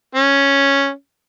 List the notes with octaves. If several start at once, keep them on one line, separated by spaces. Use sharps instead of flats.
C#4